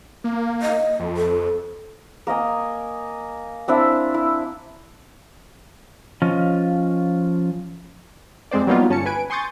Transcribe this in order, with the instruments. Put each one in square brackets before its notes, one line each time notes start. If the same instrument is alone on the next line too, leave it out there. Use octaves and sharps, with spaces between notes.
[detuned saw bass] A#3
[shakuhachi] D#5
[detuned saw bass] F2
[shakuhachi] A4
[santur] A#3 A#4 D#5 G#5
C4 D4 E4 E5
E4
[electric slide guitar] F3 C#4 F4 D#5
[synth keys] F2 G#3 C4 C5 D5
F#3 G3 A#3 B3 D#4 F4
G1 C#4 A5 C#7
B4 G#5 D7
G#5 C6 C#6 D#6 G6 A6